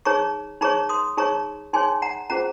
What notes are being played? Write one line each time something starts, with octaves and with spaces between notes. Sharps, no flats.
D#4 G#4 C#5 A#5 C#6
D#4 G#4 C#5 A#5 C#6
C6 D#6
D#4 G#4 C#5 A#5 C#6
D#4 G#4 C#5 G#5 C6
F#5 A#5
C#4 F4 G#4 C5 F#5 A#5